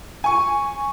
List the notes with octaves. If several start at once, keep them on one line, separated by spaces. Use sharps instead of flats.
G#5 C#6